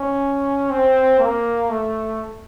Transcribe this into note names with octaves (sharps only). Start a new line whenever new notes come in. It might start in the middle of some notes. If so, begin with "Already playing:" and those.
Already playing: C#4
C4
A#3
A3